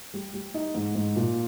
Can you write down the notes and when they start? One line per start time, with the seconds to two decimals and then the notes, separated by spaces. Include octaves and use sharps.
0.14 G3
0.34 G3
0.54 D#4
0.75 G#2
0.95 G#2
1.16 A#2